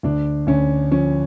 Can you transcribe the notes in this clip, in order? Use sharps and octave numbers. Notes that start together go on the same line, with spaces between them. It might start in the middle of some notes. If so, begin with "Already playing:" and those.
D2 D4
D2 C#4
F3 C#4